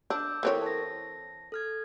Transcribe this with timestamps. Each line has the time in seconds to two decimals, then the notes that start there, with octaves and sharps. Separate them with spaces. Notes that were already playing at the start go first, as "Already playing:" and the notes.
0.10 D4 D6 E6 G6
0.43 E3 C4 E4 A4 A#4 C#5
0.62 A5 A#6
1.52 A4 F6 G#6